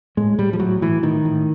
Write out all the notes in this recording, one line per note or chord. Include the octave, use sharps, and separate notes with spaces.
A2 G#3
A2 G3
F3
A2 F#3
A2 E3
A2 D#3
A2